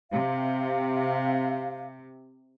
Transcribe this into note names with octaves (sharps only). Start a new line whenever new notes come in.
C3 F5